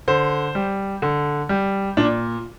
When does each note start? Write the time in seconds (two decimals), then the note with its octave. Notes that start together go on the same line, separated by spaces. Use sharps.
0.08 D3 C5
0.55 G3
1.02 D3
1.49 G3
1.97 A#2 D4